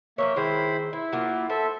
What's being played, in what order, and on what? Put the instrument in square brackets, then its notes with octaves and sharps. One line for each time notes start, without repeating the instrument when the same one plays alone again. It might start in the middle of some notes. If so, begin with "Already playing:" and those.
[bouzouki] F3 C5 C#5 [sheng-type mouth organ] A#3 E5
[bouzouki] D#3 G#3 [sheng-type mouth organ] E4 C5 B5
[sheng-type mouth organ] E4 [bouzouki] E5
[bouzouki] F#3 A#3 F4
[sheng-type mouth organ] A4 E5 [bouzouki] C5